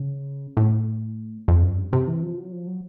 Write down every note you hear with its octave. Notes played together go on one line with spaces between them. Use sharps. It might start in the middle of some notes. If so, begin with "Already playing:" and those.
Already playing: C#3
A2
F2
F#2
G2
C3
E3
F3
F#3
F3
F#3